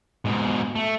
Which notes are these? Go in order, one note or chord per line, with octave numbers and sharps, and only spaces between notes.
G#2 B2
A3